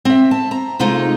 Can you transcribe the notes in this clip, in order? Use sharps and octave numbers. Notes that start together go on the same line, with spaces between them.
C4 E5
A5
A#5
C3 G#3 A3 D#4 F4